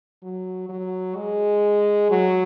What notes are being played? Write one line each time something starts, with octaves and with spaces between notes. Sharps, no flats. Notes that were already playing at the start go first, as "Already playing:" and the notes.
F#3
F#3
G#3
F#3